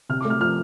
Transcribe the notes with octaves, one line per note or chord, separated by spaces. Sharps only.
C3 F6
D6
A3
F6
F3 F6